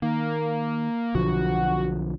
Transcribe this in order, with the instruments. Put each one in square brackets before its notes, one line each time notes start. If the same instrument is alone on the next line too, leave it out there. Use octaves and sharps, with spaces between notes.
[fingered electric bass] D#3 [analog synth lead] A#3
[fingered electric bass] B1 D3 F3 [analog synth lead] F#4